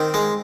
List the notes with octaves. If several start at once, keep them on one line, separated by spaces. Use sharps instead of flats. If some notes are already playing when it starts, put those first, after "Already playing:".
Already playing: D#3 C4
G#3